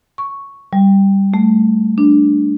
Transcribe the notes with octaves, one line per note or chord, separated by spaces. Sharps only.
C#6
G3
A3
D4